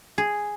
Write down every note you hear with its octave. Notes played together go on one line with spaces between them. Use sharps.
G#4